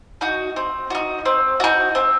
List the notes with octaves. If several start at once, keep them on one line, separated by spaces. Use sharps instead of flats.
D#4 F#4
C4
D#4 F#4
C4
D#4 F#4
C4